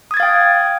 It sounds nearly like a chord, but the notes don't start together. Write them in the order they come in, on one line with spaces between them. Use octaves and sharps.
D#6 G#6 A6 F5 G5